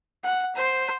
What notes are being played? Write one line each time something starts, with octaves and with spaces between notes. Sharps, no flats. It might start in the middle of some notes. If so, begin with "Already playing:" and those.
F#5
C5